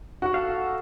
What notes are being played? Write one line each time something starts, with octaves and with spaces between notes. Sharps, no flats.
F#4 F#5
A4 F5